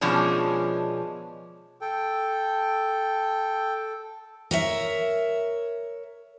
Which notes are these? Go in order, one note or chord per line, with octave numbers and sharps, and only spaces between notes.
B2 F3 G#3 C#4 D4
A4 G5
A#4 C#5 E5